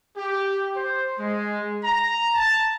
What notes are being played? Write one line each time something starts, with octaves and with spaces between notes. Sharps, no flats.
G4
C5
G#3
A#5
A5